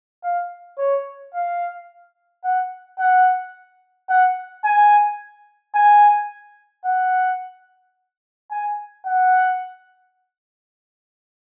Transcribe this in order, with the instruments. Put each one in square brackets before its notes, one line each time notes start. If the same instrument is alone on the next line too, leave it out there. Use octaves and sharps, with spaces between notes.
[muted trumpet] F5
C#5
F5
F#5
F#5
F#5
G#5
G#5
F#5
G#5
F#5